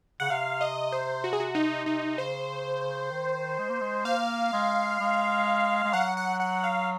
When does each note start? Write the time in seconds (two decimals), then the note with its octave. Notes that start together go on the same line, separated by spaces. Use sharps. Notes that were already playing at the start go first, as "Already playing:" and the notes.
0.20 C#3 F#5
0.30 C3 F5
0.61 D#5
0.92 C5
1.24 F#4
1.33 G#4
1.40 F#4
1.55 D#4
1.86 D#4
2.18 C#3 C5
3.11 D#3
3.58 G#3
3.69 A#3
3.81 G#3
4.05 A#3 F5
4.52 G#3
5.00 G#3
5.84 G#3
5.93 F#3 F#5
6.17 F#5
6.40 F#5
6.64 F5